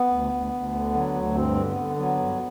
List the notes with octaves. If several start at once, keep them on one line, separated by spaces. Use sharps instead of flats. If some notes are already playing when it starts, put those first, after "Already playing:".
Already playing: B3
D2
D2
D2
D3
F#3
D2
G2 C4
D3
B3
D3
F#3 B3
G2